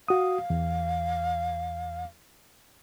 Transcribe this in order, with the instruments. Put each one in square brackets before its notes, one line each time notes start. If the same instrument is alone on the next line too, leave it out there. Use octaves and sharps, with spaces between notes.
[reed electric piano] F#4 D#6 [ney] F5
[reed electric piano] E2